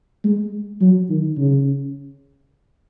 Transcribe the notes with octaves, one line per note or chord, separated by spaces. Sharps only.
G#3
F#3
D#3
C#3